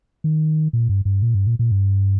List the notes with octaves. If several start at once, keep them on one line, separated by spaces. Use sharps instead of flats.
D#3
A#2
G2
G2
A#2
G2
A#2
A#2
G2